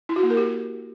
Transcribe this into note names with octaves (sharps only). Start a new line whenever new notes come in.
E4
F#4
A#3
A#4
G4